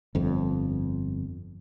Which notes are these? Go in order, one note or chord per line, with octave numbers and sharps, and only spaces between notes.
G1 F2